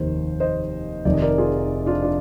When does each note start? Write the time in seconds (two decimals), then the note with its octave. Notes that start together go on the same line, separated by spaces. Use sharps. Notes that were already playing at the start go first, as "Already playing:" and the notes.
Already playing: F1 D#2 D#3 C5
0.40 C5 D#5
1.05 F1 F2 D#3 D5
1.13 D#5
1.22 A#4 D5
1.38 F4 G#4
1.86 D4 F4
2.02 D4 F4